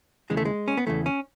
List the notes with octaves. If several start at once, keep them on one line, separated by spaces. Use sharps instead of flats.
D#2 C#3 E3 G#3
A3
G#3
C#4
B3
E2 C#3 E3 A3
C#4